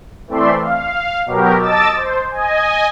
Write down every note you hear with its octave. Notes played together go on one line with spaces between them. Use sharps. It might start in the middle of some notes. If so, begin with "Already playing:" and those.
E3 A3 C4 D5 E5 C6
F5
B2 F#3 G4 A#4
D#5 A5 D6 E6 A6
C5
D#5 G#5